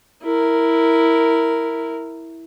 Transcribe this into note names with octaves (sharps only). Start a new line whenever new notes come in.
E4 A#4